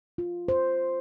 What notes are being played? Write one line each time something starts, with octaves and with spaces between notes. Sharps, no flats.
F4
C5